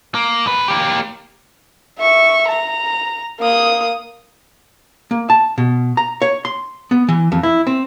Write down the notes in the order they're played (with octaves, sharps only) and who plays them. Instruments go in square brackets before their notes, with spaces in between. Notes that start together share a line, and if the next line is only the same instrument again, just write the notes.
[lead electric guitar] A#3
G#2 B4
A#3 G4
[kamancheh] E5 C#6
A#5
A#3 D#6
[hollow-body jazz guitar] A#3
A5
B2
A#5
C#5
C6
B3
E3
F2
E4
C4